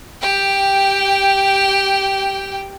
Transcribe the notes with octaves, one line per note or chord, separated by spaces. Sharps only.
G4 G5